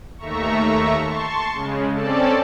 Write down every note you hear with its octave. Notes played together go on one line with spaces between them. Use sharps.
D#2 A3 E5 A#5 C#6
A5 C6 C#6
C#3 G#3
C4 C#4 A4 D5 A5